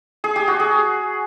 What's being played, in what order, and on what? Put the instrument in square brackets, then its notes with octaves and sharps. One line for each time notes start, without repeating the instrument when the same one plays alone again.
[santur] G#4
G4
F#4
G#4